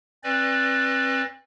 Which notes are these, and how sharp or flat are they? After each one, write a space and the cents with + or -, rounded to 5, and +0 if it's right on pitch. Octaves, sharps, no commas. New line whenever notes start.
C4 +40 B4 +0 D5 +0